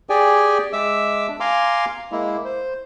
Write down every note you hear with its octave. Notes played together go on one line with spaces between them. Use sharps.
G4 G#4 D5 G5 G#5
G#3 E5 D6 E6
D4
F5 G#5 A#5 C6 D6
G#3 A#3 E4
C5